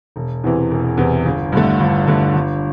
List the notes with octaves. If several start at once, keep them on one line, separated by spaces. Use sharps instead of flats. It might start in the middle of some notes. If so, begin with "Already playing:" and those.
E1
E2 C3 E3
E1
E2 C3 E3
G1
G2 D3 A3
G1
G2 D3 A3
G1